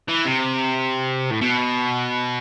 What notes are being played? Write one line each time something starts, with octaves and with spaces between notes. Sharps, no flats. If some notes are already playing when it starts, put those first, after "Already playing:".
E3
C3
A2
B2